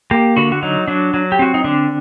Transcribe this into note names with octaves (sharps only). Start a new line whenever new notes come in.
A#3 G4
D3 F#4
F#4
F#3 D#4
F#3 D4
F#3
G4
C4 F#4
D#4
D3 D4